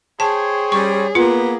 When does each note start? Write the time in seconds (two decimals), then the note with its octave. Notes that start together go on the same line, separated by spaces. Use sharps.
0.20 G#4 C5 C#5 G5 A5
0.72 G3 C#4 C#6
1.15 A#3 B3 F4